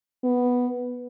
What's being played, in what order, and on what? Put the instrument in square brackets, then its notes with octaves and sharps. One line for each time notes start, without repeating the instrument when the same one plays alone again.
[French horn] B3